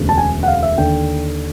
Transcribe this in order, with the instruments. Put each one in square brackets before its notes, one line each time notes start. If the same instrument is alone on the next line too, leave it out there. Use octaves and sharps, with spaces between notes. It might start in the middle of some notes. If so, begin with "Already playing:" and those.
Already playing: [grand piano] E1 D2 C#3
A5
G#5
F#5
F5
E5
D#2 D3 G5